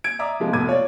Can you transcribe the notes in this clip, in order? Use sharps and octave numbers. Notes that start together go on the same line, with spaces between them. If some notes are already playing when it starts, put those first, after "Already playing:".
G#6 D7
D5 E5 A#5 D6 D#6
C3 F3 G#3
F1 B2 A3 D6 G#6 D#7
F4 C#5 D5